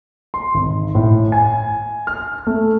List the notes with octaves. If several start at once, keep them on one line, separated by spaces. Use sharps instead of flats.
C6
G#1
A2
G#5
F6
A3